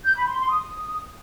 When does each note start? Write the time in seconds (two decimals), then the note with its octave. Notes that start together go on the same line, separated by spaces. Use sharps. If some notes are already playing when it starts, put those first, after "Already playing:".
0.05 G6
0.16 B5
0.27 C6
0.38 C6
0.49 D#6